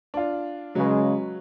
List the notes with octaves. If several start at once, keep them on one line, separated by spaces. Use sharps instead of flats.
D4 F4
C#3 F#3 G#3 B4